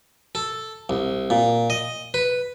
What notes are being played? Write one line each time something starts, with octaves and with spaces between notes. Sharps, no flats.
A4
C2
A#2
D#5
B4